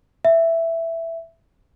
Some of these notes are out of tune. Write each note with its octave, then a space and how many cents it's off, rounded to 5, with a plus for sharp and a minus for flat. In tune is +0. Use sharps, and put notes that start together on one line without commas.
E5 +5